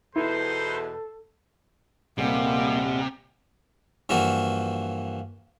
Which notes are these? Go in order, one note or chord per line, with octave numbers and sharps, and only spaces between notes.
E2 B2 D#4 E4 A4 B4 C5
D#1 C3 G3 G#3 A#3 B3
G2 E3 F3 A#3 F#4